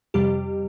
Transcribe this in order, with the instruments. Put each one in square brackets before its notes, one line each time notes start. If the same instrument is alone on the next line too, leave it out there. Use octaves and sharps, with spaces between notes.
[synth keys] F2 C3 G3 G4